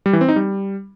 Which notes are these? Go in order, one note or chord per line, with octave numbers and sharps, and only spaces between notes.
G3
E3
C4
D#4
G3